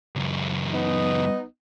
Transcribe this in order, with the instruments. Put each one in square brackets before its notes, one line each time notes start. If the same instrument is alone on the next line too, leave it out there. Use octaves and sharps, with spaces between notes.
[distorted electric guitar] C#2 F#2
[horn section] B3 D#4 D#5